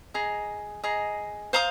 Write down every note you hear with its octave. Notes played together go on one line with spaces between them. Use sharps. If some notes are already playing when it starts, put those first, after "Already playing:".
G#4 D#5 A#5
G#4 D#5 A#5
C5 F5 A#5 D#6